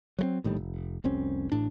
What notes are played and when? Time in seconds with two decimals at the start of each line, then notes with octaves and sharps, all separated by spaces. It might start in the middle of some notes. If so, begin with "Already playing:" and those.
0.19 F#3 G#3 C4
0.44 A#1 A2 D#3 G3
0.57 F1
1.04 F1 C2 C4 C#4
1.52 A1 A2 D4